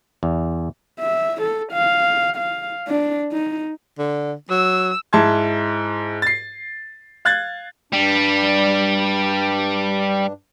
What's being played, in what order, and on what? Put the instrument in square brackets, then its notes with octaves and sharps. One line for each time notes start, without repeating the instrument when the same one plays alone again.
[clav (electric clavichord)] E2
[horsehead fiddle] E5
A4
F5
F5
D4
D#4
[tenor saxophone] D3
[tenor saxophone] F#3 [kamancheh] E6
[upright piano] G#2 E4 A5 C6 G#6
A6 C7
F5 F#6 G#6 A6
[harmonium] G2 D4 [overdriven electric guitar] G3